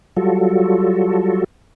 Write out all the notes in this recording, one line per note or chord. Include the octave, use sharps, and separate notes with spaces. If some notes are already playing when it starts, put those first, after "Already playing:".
F#3 G3 F4 F#4 A4